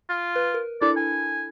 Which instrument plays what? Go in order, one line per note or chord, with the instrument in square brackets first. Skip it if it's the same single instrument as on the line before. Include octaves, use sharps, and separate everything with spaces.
[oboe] F4
[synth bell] B4
A#4
[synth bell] D4 E4 A4 [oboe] D5
[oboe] G#5